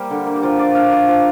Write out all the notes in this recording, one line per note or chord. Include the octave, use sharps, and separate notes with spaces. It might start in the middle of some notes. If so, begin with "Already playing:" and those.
Already playing: G3 A#3 G4 A#4 C5
D3
A#3
G4
F3 A#4
F4 D5
D4 F5
F3 D5
F3